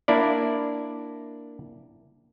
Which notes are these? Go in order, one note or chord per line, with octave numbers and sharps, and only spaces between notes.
A#3 D4 E4 D5